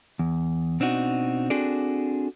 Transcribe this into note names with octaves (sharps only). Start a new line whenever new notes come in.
E2
B2 C4 D4 D#4 F#4
C4 D4 F#4 G#4 A4 D5